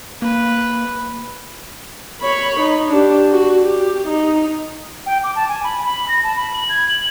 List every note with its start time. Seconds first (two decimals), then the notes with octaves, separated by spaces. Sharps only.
0.22 A#3 B4
2.21 C#5 B5
2.60 D#4
2.92 D4 G4
3.31 F#4
3.62 G4
4.08 D#4
5.06 G5
5.23 D6
5.35 A5
5.48 G#5
5.64 B5
5.84 B5
6.08 A#6
6.23 A5
6.36 B5
6.54 F#7
6.69 G#6
6.89 F#7